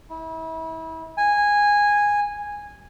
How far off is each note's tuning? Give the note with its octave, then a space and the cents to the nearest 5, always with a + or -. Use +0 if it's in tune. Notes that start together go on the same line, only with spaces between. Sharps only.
E4 -35
G#5 -10